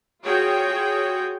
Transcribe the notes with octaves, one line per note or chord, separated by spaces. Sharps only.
F4 F#4 G#4 C#5 G5